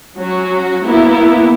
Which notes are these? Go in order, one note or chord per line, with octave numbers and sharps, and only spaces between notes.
F#3 C#4 F#4
A#3 B3 E4